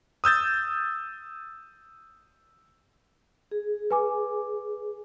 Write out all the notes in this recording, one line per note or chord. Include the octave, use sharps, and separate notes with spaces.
D#6 E6 G6 A6
G#4
B4 G#5 D6